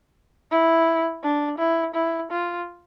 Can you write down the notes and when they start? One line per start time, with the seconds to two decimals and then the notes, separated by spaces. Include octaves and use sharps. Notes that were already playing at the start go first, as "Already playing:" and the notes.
0.51 E4
1.23 D4
1.58 E4
1.94 E4
2.31 F4